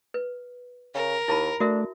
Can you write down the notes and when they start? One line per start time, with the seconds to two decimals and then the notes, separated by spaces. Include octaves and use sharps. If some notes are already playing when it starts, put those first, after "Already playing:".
0.14 B4
0.94 C#3 A#4
1.28 D#2 E4 A5 B5
1.60 A3 D4 F#4 A#4 E5